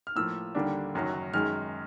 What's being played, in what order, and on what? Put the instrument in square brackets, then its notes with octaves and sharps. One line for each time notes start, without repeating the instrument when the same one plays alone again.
[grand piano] F6
A2 F3 A#3 E6
D#2 D3 G3 A#3 D4
F#1 F#2 D#3 F#3
F#2 D#3 G#3 F6